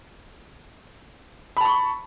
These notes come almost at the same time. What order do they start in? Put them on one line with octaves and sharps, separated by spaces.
B5 A5 C#6